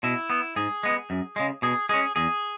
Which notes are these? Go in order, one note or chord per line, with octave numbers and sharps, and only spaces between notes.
B2 E4
B3
G#2 G#4
G#3 B3
F#2
C#3 G#3
B2 G#4
G#3 C#4 G#4
E2 G#4